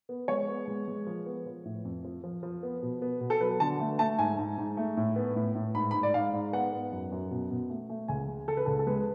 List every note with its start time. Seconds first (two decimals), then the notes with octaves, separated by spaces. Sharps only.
0.09 B3
0.28 G#3 C#5
0.48 B3
0.68 G#3
0.88 G#3
1.07 F3
1.26 B3
1.46 F3
1.65 A2
1.85 F2
2.04 F3
2.24 F3
2.43 F3
2.63 B3
2.82 B2
3.02 B3
3.21 B2
3.30 A4
3.41 F#3 B4
3.60 D3 A5
3.80 A3
3.99 A3 A5
4.18 G#2 G#5
4.38 G#2
4.58 G#2
4.77 A3
4.97 A2
5.16 B3
5.36 A2
5.55 A2
5.75 G#2 B5
5.91 B5
5.94 G#2
6.03 D5
6.14 G#2 F5
6.33 G#2
6.53 B3 F#5
6.72 B3
6.92 F#2
7.12 F#2
7.31 B2
7.51 B2
7.70 A3
7.90 A3
8.08 C#2 G#5
8.28 C#3
8.48 C#3 A4
8.57 B4
8.66 C#2 A4
8.79 A4
8.87 G#3 B4